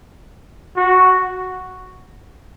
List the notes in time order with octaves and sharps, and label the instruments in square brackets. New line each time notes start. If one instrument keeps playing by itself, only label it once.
[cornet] F#4